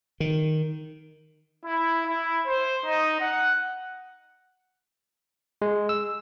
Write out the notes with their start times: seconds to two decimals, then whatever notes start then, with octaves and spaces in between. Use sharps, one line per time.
0.20 D#3
1.65 E4
2.06 E4
2.46 C5
2.86 D#4
3.21 F#5
5.62 G#3
5.89 E6